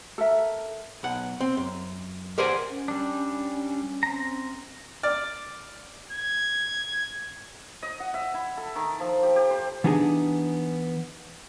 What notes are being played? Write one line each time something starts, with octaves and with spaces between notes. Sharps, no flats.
A4 A#4 E5
B1 F#5
C4
F#2
G4 A#4 C5 D5 F#5 G#5
C#4
G3 D4
C4 A#5
D5 F6
G#6
D#5
F#5
E5
E4
A4
D#3
F3
G4
G4
C5
E3 B3 D4 D#4 G4 G#4